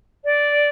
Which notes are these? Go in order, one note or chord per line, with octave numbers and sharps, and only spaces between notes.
D5